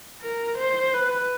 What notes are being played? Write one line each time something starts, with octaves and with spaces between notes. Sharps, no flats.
A#4
C5
B4